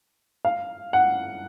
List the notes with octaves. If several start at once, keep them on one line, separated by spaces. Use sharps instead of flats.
F5
F#5